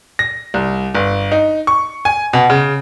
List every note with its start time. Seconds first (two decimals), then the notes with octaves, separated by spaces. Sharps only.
0.19 A#6
0.54 C2
0.95 G1
1.32 D#4
1.67 C#6
2.05 G#5
2.33 B2
2.50 C#3